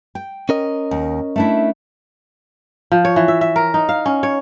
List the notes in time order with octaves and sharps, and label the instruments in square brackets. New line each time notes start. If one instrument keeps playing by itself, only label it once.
[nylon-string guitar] G5
[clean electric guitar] C#4 A#4 D#5
[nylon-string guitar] D#2
A3 D4 E4
[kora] F3
C#5
E3
E5
E5
A#4
D#4
F5
C#4
C#5